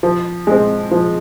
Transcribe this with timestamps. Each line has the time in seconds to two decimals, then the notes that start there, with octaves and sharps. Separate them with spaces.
0.03 F3
0.47 G#3 C4
0.91 F3